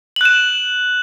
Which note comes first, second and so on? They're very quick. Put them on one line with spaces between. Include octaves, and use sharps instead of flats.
F#7 F#6 E7